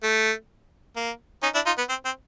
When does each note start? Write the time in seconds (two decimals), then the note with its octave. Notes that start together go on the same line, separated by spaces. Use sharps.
0.03 A3
0.96 A#3
1.43 C#4 D#4
1.55 D4 E4
1.66 D#4 F4
1.78 B3
1.89 C4
2.05 C4